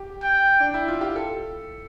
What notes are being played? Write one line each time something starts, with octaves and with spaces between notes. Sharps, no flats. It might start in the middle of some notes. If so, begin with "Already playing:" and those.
Already playing: G4
G5
D4
E4
F4
G4
A4